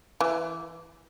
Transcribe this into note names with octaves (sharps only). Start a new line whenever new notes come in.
E3